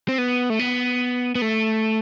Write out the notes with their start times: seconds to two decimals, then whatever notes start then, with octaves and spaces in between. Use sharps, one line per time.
0.09 C4
0.18 B3
0.50 A3
0.59 B3
1.35 B3
1.42 A3